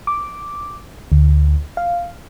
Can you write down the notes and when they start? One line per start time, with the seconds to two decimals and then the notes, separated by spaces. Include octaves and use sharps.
0.07 D6
1.12 D2
1.77 F5